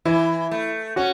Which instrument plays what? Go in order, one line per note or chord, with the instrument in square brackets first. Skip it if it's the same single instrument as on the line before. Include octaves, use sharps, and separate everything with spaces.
[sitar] E3 [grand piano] E4
[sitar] A3
[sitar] C#4 [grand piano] F#4